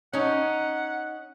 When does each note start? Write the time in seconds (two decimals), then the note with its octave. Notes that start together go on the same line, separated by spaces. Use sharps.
0.13 C#4 D#4 F#5